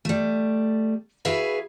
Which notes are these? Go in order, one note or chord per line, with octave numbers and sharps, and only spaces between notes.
G3 A3
E4 F#4 G#4 B4 E5 F5